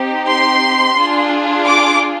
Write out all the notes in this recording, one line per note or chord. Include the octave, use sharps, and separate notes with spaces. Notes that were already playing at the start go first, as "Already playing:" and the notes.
Already playing: C4 D#4 G4
C6
D4 F4 G#4
D6